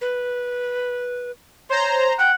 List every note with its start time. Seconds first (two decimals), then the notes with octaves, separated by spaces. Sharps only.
0.01 B4
1.69 C5 C#5 A#5
2.19 F#5 G5